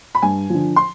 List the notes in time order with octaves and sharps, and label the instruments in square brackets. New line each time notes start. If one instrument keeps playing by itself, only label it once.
[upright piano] B5
G2 G#5
D3 F3
C6